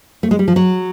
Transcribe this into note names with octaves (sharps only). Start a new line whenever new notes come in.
A3
G#3
G3
F3
F#3